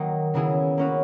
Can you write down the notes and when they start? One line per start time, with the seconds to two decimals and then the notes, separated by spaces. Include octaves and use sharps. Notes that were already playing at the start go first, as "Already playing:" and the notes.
Already playing: D#3 F#3 A#3 D#4
0.34 C#3 F#3 B3 E4 G#4
0.77 A#3 C#4 F#4 B4